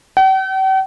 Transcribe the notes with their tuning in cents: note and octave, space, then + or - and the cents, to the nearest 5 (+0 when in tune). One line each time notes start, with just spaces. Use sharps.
G5 -45